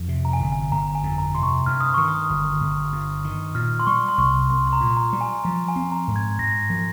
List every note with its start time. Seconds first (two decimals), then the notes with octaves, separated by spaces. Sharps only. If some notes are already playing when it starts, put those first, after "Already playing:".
Already playing: F2
0.08 C3
0.25 A#5
0.33 G#5
0.40 G1
0.52 G#5
0.71 G1 A#5
0.95 G#5
1.03 F2
1.18 A#5
1.35 C3 C6
1.43 C#6
1.66 G2 F6
1.81 D#6
1.94 D#3 C#6
2.08 D#6
2.30 G1
2.61 G1
2.92 G2
3.24 D#3
3.55 A#2 F6
3.79 C6
3.87 G3 C#6
4.09 C6
4.18 C2 C#6
4.50 C2 C6
4.67 C6
4.73 A#5
4.81 A#2
4.86 C6
4.97 A#5
5.13 G3
5.21 G#5
5.44 F3 A#5
5.68 G#5
5.76 C4
5.92 A#5
6.08 G#2
6.16 G#6
6.38 G#2 A#6
6.70 F3